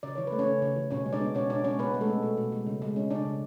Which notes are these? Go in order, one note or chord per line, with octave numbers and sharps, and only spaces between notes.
C#3 D5
E3 C#5
A3 B4
C#4 C#5
C#3
C#3
E3
B2 C#4 C#5
G#3
D4 D5
B3
B2 C#4 C#5
B2 D4 D5
G#3 C#4 C#5
B2 B3 B4
G#3
A3 A4
C#4
B2
B2
G#3
C#3
G#3
C#4
C#3 D4 D5
C#3